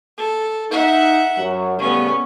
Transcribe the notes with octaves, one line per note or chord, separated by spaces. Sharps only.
A4
D#4 E5 F#5
F#2 F#3
A2 C#3 G3 B3 C#4